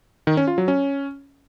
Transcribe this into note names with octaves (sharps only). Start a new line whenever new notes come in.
D#3
C#4
F4
F#3
C#4